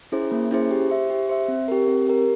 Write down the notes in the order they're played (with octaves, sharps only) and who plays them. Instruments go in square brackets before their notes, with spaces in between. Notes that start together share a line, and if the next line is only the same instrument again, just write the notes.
[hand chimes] C#4 E4 G#4 C5
A#3
C#4 E4 G#4 C5
G4
C5 E5
G4
C5 E5
C4
G4 A#4
C4
G4 A#4